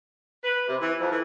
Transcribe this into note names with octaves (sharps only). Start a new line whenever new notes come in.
B4
C3
E3
F2
E3